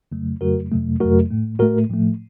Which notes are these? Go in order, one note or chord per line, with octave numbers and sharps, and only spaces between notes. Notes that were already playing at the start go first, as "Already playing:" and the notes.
F2 C#3 F#3 A3
F2 C#3 F#3 A3 F#4 A#4
F2 C3 F#3 A3
F2 C3 F#3 A3 F#4 A#4
A2 A3
A2 A3 F#4 A#4
A2 F3 A3